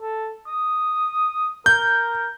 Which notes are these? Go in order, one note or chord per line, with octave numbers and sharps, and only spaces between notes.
A4
D#6
A#4 G6